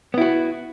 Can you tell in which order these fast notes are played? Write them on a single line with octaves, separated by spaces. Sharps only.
B3 E4 F#4